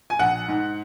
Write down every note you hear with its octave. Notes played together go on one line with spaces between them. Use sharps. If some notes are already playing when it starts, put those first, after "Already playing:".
G#5
A#1 F#5
G#2